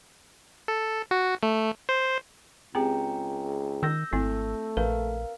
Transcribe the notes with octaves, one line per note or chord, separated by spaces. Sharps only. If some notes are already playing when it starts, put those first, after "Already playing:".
A4
F#4
A3
C5
C#2 C4 G4 G#4 G5 A#5
D#3 E6 G6 A#6
G#1 A3 C4 E4
A#1 A#4 B4 F5